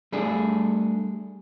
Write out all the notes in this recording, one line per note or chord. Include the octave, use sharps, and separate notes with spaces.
G3 A3 D4 G#4